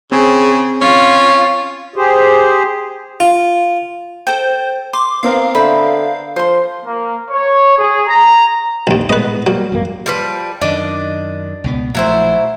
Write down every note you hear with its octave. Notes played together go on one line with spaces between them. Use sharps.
C#3 C4 G#4
C#4 F4
G4 G#4 C5
F4
A4 C5 G5
C6 D6
B3 C4 A#4 F5
D3 C5 E5 B5
F3 C5 C6
A#3
C#5
G#4
A#5
A#1 D#2
A2 G#3 B3 B4 D#5
F#3 G3 A#3
G#1 F#2 A#3
F3 G3 B4
F#2 D#3 D4 D5 D#5
C#2 B2 B3
A#1 F3 F#3 A3 E4 C5